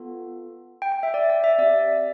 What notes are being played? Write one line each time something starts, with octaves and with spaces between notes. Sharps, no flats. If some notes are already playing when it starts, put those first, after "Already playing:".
Already playing: B3 F4 A4
G5
G5
E5
D5
D5
E5
C4 G4 D5